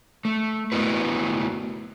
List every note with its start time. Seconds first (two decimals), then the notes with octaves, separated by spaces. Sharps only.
0.25 A3
0.72 A3 B3 E4 F#4 B4